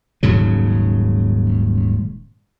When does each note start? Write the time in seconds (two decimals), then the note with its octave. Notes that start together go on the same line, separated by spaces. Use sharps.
0.23 D#1 G#2 C#3 F#3